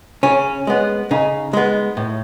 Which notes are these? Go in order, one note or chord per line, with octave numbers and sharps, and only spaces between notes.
C#3 C#4
G#3 B3
C#3 D#4
G#3 B3
A2